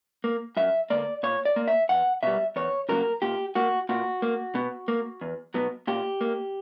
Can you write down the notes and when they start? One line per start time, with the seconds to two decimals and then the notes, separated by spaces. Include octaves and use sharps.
0.24 A#3
0.57 F#2 E5
0.90 D3 A#3 D5
1.23 A#2 C#5
1.45 D5
1.56 A#3
1.68 E5
1.89 E2 F#5
2.23 B2 G3 E5
2.56 E2 C#5
2.89 C#3 F#3 A#3 A#4
3.22 A#2 G4
3.55 A#3 F#4
3.89 A#2 F#4
4.22 A#3
4.55 B2
4.88 A#3
5.21 E2
5.54 B2 F#3 B3
5.87 A#2 G4
6.21 A#3